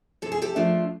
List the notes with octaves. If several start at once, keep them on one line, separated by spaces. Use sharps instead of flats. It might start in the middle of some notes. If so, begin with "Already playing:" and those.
C3 A4
G#4
G4 A4
F3 A3 D4 F4